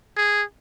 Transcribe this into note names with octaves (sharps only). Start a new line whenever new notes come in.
G#4